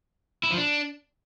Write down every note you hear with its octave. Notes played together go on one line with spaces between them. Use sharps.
E4
F3
D4